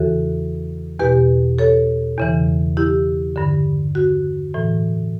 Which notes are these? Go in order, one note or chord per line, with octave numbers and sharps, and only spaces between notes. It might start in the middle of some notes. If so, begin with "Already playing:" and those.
Already playing: E2 C#3 E3 F#4 A4
E2 B2 G4 B4
A4 C#5
E2 C#3 E3
E4 G4
G2 D3
F#4
A2 E3